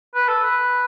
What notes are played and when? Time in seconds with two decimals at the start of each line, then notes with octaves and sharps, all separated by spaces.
0.15 B4
0.28 A4
0.43 B4